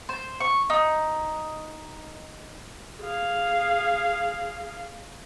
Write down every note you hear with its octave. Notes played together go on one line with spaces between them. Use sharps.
C5
C#6
D#4
G#4 F5